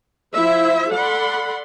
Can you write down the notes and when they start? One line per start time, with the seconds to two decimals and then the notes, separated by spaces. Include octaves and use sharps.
0.34 F3 E4 C5 E5
0.91 A4 D5 F#5 B5 C6